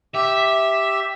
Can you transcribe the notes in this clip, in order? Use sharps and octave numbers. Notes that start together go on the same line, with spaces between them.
G4 E5